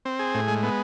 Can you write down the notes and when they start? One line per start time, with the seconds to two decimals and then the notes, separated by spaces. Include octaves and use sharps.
0.05 C4
0.19 G#4
0.34 A2
0.48 G#3
0.63 B3